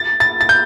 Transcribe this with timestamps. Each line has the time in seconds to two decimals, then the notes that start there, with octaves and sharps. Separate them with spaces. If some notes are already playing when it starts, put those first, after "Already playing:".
Already playing: A6
0.20 A6
0.41 A6
0.49 G6